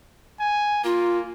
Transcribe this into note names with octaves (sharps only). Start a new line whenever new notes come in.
G#5
A#3 F4